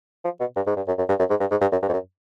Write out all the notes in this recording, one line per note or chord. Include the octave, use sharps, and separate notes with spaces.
F3
B2
G2
G#2
G2
F#2
F#2
G2
F#2
G#2
G2
G#2
G2
F#2
G2
F2
F#2